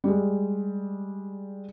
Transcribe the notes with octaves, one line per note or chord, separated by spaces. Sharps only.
G3 G#3